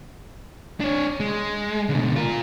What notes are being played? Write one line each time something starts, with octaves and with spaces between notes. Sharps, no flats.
D4 C#5
G#3
B2 D3
F4 A#4